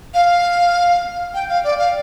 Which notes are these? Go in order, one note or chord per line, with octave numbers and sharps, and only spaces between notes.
F5
G5
F5
D5
F5